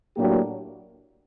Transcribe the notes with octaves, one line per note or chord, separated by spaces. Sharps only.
A2 F#3 A#3 D4 G4